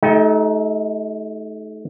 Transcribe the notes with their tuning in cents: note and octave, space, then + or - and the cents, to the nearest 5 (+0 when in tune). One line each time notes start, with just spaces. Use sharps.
A3 -30 D#4 +20 G4 +0